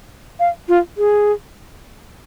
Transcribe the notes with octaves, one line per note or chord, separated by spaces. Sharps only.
F5
F4
G#4